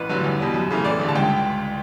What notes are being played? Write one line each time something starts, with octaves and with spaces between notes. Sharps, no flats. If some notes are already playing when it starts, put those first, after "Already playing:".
Already playing: A1 B4
G2 D3 F#3 A3
E2
B2 G3
F#2
C#3 E3 A3
A1 D5
G2 D3 A3
A5
C#2 G5